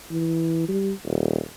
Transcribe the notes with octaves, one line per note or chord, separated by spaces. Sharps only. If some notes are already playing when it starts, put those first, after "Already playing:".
E3
G3
D#1